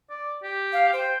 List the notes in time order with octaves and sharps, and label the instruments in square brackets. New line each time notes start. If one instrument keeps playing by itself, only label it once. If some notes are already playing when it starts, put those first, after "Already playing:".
[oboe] D5
G4
[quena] F5
[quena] C5 [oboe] G5